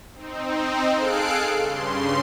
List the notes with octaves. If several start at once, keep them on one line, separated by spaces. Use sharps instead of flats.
C4 D#4
G#4 A4 F5 F#6 C7 D7
G2 C#3 C6